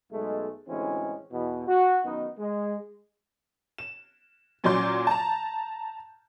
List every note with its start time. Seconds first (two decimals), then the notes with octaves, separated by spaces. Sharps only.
0.12 B1 G#3 A3
0.68 D2 A2 E3 G#3 C4 C#4
1.32 E2 B2
1.67 F#4
2.05 F#2 D#3 B3 D#4
2.38 G#3
3.78 E7
4.64 A#2 F#3 C#4 D5 C6 G6
5.07 A5 A#5